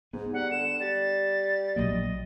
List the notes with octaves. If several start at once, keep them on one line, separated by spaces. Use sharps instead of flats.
G#2 B3
G3 F#5
D3 E7
G3 A6
A#1 F#3 A#3 D#5